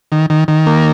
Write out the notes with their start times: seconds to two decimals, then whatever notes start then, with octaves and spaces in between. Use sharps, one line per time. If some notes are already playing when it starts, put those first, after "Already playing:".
0.12 D#3
0.30 D#3
0.48 D#3
0.66 A#3